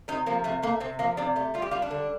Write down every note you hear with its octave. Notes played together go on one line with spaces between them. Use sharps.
C3 D#4
F3 A#3
C3 A3
A3 A#3
C3 C4
F3 A#3
C3 D4
A3 G4
G3 F4
G4
G3 F4
D4
D3